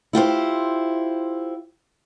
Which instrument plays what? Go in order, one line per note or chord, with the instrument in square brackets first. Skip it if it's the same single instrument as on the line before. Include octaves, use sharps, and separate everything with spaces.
[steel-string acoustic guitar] E4 F4 G4 C5